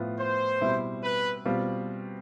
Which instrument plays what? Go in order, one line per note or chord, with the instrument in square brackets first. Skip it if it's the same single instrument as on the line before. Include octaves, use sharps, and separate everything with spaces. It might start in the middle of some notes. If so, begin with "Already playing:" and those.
Already playing: [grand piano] A2 F3 B3 F4
[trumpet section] C5
[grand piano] B2 G3 C4 E4
[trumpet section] B4
[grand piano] B2 G3 C4 F4